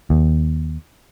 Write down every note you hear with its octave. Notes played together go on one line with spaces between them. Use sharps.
D#2